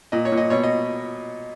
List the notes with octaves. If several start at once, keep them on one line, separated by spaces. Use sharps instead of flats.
A#2 D#5
C#5
A#2
D#5
B2 C#5
D#5